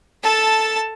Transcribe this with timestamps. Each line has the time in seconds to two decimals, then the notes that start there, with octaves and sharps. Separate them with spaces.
0.23 A4 A5